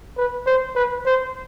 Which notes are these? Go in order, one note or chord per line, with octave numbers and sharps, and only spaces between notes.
B4
C5
B4
C5